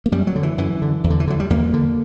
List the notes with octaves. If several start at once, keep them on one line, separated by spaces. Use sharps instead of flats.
A#3
F#2 G3
F#3
D3
E3
F#2 E3
D3
E2
D3
E3
D3 F#3
G3
E2 A#3
D3